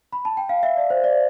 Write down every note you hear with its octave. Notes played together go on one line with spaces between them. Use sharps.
B5
A5
G5
F5
E5
D5
C5
D5